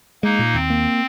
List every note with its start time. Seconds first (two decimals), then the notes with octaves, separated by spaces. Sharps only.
0.23 G#3 A#3 D#4
0.39 A#2
0.54 D#2 C4
0.70 A#3